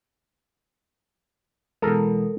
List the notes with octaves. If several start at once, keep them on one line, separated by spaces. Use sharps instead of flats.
B2 E3 G#3 A4 A#4 A#5